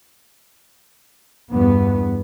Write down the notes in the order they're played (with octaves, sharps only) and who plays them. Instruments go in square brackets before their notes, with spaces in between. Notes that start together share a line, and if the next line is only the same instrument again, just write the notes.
[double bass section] E2 G2 B3